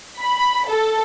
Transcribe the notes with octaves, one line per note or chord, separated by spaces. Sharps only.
B5
A4